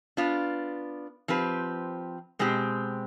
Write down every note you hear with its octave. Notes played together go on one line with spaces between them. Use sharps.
B3 D4 F4
F3 C4 G4 B4
B2 G#3 C4 G4